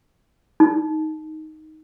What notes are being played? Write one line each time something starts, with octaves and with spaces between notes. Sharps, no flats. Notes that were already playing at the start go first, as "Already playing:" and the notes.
D#4